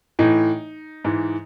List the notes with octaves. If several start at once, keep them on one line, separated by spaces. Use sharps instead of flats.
A2 E3 D#4
G#2 E3